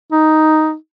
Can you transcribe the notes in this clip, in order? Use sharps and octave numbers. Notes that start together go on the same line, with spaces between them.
D#4